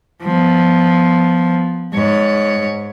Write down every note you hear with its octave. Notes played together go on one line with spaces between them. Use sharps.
F3 B3
G#2 C#5